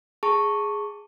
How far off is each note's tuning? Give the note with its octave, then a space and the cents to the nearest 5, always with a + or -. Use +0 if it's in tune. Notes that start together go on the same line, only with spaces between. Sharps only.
G#4 +0 A5 +20 C#6 -5